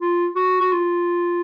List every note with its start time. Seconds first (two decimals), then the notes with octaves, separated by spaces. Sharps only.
0.01 F4
0.36 F#4
0.61 F#4
0.72 F4